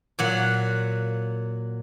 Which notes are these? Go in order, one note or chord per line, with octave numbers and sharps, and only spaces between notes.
A#2 F#3 F#5